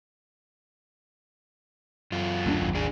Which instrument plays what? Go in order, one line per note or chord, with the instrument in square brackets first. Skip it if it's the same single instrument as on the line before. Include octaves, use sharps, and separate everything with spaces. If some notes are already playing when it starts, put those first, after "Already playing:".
[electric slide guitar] F#2 F4
[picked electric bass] D2 C4 D4
G#1 D#2
[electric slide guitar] D4 G#4